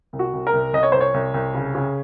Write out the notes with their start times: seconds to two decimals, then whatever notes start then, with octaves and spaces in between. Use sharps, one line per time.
0.13 C2
0.19 F#4
0.33 C2
0.47 A#4
0.53 C2
0.73 C2 D#5
0.83 C#5
0.92 C2 C5
1.01 C#5
1.14 C2
1.34 C2
1.54 C#3
1.75 C#3